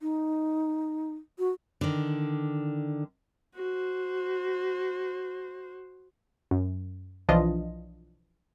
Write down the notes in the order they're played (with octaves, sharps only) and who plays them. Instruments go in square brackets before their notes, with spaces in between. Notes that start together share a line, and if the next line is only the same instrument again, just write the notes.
[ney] D#4
F#4
[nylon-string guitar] D3 D#3
[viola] F#4 C5
[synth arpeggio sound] F#2
B1 E3 F3 D4 F4 D#5